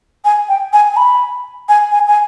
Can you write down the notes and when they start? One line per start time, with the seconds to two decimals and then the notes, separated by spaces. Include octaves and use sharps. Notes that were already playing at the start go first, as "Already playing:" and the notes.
0.25 G#5
0.49 G5
0.73 G#5
0.92 G#5
0.97 B5
1.69 G#5
1.92 G#5
2.08 G#5